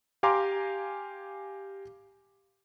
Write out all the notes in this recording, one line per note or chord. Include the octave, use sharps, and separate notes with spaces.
G4 F5 G#5 A#5 C6 D6